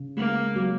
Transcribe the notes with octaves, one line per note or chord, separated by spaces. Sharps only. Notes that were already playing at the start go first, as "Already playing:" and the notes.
Already playing: C#3
G#3 A#3
F#3